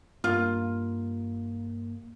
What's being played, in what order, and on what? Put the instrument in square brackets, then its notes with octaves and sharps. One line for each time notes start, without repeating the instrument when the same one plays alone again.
[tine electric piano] G2 A#3 [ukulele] F4